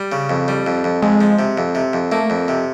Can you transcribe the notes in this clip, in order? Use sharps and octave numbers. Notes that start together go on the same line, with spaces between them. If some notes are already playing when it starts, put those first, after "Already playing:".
Already playing: G3
C#3
F2
G3
F2
F2
F2 G#3
F3
C3
F2
C3
F2
A3 A#3
F2
C3